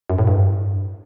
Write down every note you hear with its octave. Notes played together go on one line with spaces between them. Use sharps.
F#2
A2
G2